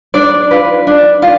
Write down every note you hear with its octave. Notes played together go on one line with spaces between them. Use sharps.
D4 D5
F4 B4
D4
F4